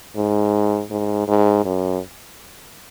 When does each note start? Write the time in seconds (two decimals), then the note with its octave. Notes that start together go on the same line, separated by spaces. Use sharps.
0.16 G#2
0.91 G#2
1.28 G#2
1.65 F#2